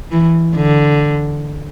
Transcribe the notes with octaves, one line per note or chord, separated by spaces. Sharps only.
E3
D3